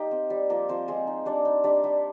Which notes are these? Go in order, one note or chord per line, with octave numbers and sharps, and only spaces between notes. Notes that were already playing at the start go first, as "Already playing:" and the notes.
Already playing: A#3 D#4 G4
C4
G3
F3 A#3 A#4
F3 C4 C5
G#3 C4 G#4
D#4
G3 D4 D5
D#4
G3 D4 D5
G3